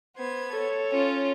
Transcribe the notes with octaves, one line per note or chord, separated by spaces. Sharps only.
B3 C5 G#6
A4 C#5
C#4 F4